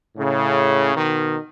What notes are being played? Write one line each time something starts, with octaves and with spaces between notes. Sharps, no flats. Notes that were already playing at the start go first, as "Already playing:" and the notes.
A2 C#3
B2 D#3